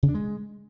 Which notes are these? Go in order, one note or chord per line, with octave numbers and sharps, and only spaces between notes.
C#3
D4
G#3